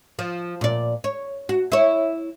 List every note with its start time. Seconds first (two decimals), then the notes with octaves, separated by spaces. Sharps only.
0.19 F3
0.61 A#2 D5
1.04 C#5
1.49 F#4
1.72 E4 C#5